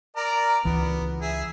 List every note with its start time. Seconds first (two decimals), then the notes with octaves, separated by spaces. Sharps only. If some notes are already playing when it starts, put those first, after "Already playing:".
0.17 A#4 D5 A#5
0.65 C#2 E3 B3
1.21 G#4 E5